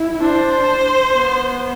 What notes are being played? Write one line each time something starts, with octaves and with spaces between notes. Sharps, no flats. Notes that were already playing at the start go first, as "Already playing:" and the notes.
Already playing: E4
D4 C5
B3